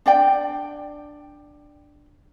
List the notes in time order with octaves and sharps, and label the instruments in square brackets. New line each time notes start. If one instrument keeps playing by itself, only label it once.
[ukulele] D4 D5 G5